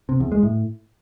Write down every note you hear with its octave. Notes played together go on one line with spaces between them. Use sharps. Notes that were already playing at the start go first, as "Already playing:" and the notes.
C3
E2
G#3
A2